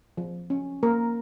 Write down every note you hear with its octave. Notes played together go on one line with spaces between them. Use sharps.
F3
C#4
A#3 A#4